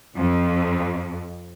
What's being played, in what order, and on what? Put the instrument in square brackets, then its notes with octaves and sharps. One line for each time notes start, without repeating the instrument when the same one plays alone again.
[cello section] F2